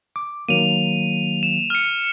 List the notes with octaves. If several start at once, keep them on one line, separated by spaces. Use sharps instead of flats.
D6
D#3 F#3 A#3 D#7 F7
E7
F6 C#7